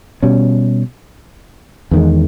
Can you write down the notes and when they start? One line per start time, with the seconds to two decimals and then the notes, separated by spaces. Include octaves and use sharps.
0.23 B2 G3 C#4
1.91 E2 D#3 G#3